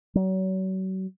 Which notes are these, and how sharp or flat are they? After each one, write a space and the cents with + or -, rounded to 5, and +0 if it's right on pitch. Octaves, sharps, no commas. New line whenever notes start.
F#3 +35